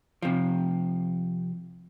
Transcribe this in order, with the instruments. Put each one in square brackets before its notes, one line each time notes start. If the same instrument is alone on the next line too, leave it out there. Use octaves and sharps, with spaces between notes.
[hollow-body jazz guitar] C3 F3